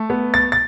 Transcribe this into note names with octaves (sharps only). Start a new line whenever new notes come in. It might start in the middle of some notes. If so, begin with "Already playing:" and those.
Already playing: A3
B3
A6
A6